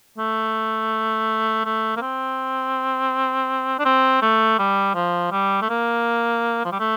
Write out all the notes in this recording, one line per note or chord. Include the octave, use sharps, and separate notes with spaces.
A3
A3
A#3
C4
D4
C4
A3
G3
F3
G3
A3
A#3
F3
G3
A3